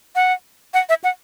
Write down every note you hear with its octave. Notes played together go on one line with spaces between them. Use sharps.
F#5
F#5
E5
F#5